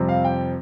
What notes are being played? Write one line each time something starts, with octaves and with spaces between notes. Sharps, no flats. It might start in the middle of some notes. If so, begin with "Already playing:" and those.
Already playing: F2 C3 G3 C4
F5
G5